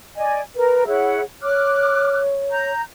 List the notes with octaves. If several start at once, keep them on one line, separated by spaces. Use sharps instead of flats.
D5 D#5 G#5
A#4 B4
E4 G#4 C#5 F#5
C#5 D6 F6 F#6
A#5 G6